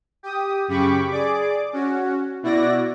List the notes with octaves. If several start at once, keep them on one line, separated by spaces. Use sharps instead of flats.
G4 D#6
F#2 C#3 G4 B5 C#6 D6
G#4 D5 D6
C#4 F#4
B2 E4 F#4 D5 A#6